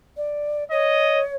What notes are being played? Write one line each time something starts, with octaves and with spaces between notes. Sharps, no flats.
D5
C#5 D#5